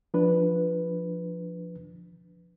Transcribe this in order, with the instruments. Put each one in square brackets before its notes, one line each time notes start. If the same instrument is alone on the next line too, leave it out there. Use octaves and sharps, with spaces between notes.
[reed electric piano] F3 D4 B4